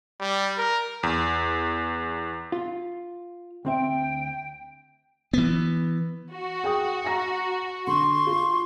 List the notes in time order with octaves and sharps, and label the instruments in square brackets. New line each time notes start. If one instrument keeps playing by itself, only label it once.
[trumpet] G3
A#4
[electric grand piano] E2
[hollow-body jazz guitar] F4
[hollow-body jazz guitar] D2 C4 E5 [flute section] G5
[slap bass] E3 B3
[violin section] F#4
[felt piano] G#4 G5 D#6
G#5 A#5 A#6
[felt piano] D3 [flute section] C6 C#6
[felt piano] F4